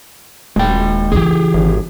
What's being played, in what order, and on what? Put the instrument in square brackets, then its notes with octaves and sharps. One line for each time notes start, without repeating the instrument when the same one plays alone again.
[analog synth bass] D#1 [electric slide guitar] G#3 G5
[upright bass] C#3 E3 [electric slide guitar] G4 G#4
[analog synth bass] G#1